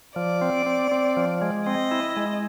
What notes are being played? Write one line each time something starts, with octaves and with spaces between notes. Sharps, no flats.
F3 D5
C4
C4
C4
F3
G#3
C4 D#5
E4
G#3